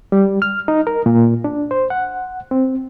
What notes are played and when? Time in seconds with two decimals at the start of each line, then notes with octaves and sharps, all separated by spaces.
0.12 G3
0.42 F6
0.68 D#4
0.87 A#4
1.06 A#2
1.44 D4
1.71 C5
1.90 F#5
2.51 C4